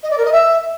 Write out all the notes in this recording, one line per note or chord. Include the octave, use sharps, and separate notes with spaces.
D#5
D5
A#4
D#5
E5